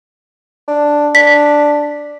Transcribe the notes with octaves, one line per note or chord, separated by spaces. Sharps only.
D4
D4 B6